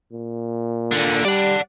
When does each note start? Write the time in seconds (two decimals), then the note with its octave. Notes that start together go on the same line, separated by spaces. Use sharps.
0.13 A#2
0.91 D#2 D3
1.25 G3 D5 F#5